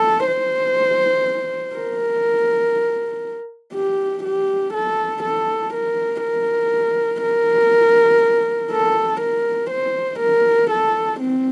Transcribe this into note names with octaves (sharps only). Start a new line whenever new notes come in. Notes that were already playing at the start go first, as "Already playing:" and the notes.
Already playing: A4
C5
A#4
G4
G4
A4
A4
A#4
A#4
A#4
A4
A#4
C5
A#4
A4
C4